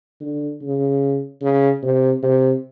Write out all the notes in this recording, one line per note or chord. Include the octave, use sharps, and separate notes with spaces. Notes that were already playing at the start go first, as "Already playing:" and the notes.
D3
C#3
C#3
C3
C3